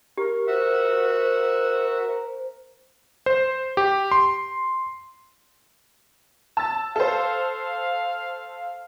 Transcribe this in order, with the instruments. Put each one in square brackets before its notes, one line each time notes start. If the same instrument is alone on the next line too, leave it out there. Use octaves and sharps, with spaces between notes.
[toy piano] G4 [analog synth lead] A#4
[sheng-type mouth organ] F#4 E5 F#5 [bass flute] C5
[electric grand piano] C5
G4
C6
[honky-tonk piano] A5 E6 A6
[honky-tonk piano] A4 C5 [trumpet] F5